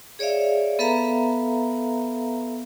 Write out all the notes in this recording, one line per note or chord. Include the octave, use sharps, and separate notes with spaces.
G#4 C#5 D5 E5 F5
B3 A4 B4 E5 F5 A#5